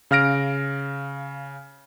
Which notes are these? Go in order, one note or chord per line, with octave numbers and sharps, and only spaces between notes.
C#3 F5 F6 A#6 D7